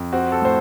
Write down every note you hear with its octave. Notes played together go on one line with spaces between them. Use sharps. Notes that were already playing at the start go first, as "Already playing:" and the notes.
Already playing: F2
C4 F#4
A4
A2 C5